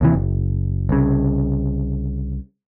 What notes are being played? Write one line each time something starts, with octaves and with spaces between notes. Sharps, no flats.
D#2 C3 E3
F#1
C2 C#3